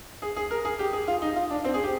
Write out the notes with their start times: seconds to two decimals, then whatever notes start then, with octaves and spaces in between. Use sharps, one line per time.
0.22 G#4
0.36 G#4
0.51 A#4
0.65 G#4
0.79 G4
0.93 G#4
1.08 F4
1.22 D#4
1.36 F4
1.50 D4
1.64 C4
1.74 G#4
1.84 G4